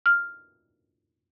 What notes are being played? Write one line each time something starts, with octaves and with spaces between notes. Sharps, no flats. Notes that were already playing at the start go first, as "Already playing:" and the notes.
F6